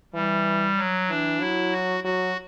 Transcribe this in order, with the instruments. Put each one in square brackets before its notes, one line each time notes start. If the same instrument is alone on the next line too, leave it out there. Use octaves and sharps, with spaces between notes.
[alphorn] E3 [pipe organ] G3
[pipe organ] F#3
[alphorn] E3 [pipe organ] D4
[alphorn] F#3 [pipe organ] E4
[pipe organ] F#4
[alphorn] F#3 [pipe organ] F#4